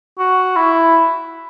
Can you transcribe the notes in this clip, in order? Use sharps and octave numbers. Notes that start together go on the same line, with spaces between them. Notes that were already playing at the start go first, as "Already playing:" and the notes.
F#4
E4